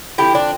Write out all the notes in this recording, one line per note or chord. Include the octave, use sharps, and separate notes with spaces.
D3 F3 C4 E4 G4
D4